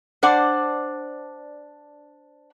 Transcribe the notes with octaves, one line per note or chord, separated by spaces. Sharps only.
D4 C5 D5 F#5